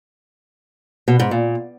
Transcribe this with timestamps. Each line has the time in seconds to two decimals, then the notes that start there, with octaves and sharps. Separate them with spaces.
1.08 B2
1.19 G#2
1.31 A#2